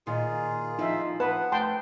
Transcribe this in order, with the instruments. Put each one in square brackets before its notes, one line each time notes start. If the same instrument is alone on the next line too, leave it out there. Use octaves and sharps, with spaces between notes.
[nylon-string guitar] A#2 D#3 [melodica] F4 G#4
[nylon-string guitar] F3 [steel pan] D#4 E5
[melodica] B3 F#5 [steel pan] B4 [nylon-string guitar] A5
[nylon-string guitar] A3 [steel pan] G5 A5 C6